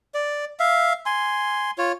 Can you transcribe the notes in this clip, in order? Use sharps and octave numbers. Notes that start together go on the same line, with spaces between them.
D5
E5 F5
G#5 C6
F4 C#5